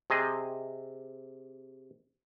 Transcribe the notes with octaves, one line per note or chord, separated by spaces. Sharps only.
C3 G#4 D#5